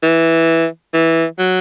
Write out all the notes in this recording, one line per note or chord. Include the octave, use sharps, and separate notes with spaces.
E3
E3
F#3